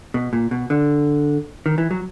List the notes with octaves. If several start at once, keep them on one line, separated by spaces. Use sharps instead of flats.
B2
A#2
B2
D3
D#3
E3
F#3